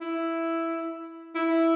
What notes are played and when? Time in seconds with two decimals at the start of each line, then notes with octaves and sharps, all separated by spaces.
0.01 E4
1.35 E4